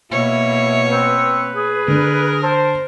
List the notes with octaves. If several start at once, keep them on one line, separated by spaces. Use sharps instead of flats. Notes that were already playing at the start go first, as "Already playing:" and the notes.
B2 A#3 E4 C#5
C4 B4
G#4
D3 A#4
C5 A5